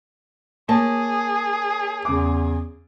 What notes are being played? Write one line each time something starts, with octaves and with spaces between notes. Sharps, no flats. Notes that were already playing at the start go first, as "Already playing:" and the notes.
A#3 G#4 C#5 A5
E2 C#3 D6